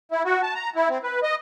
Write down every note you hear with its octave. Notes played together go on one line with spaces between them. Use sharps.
E4
F#4
A5
A#5
E4
C4
B4
D#5